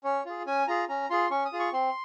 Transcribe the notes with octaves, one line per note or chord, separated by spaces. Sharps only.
C#4 C#5
F4 G#4
C#4 G#5
F4 G#4 A#5
C#4 A#5
F4 G#4 C6
C#4 C#6
D#6
F4 G#4
C#6
C4 C6